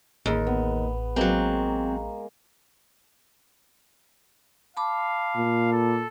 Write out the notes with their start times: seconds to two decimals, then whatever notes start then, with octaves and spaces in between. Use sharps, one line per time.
0.26 A1 D#2 G#4 B5
0.47 B3
1.16 F#3 G#3 A#3 C4 A#4
4.77 F5 A5 B5 D6
5.36 A#2
5.72 A4